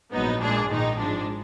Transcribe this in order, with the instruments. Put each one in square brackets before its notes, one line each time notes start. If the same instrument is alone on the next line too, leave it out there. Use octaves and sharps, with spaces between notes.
[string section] A#1 G#2 F#3 B3 D#4
A#2 G#3 D4 G#4
A#1 G#2 D#3 G#3 D#4
G#1 G#2 F3 G#3 D4